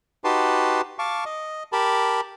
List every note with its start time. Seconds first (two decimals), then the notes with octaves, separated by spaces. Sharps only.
0.24 D#4 F#4 G4 B4 A5 C6
0.99 F5 A5 C#6 D6
1.26 D#5
1.72 G4 A#4 A5 B5